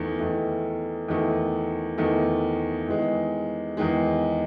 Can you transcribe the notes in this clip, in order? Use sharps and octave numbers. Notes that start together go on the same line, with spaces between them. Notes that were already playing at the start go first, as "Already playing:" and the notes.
Already playing: E2 D#3 A3
E2 D#3 A3
E2 D#3 A3
E2 D#3 A3
E2 D#3 G#3
E2 D#3 G#3